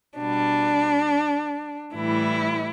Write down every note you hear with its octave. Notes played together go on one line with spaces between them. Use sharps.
B2 G3 D4
A2 E3 G3 E4